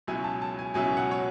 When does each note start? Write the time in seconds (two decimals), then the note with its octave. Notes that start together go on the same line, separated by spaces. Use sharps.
0.07 C#2 B2 F#3 C#4 E4 G#5
0.24 A5
0.42 A5
0.59 G#5
0.74 C#2 B2 F#3 C#4 E4 G#5
0.97 F#5
1.11 C#5